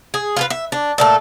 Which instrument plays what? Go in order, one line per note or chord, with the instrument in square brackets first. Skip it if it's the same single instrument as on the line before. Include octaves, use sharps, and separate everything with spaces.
[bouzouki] G#4
F4 G#4 B4
E5
D4
A#2 A3 A4